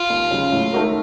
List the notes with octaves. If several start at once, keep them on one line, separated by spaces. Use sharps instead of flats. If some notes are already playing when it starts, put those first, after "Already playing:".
Already playing: F4
D#2
C#3 F#3
A2
A3 D#4 F#4 A#4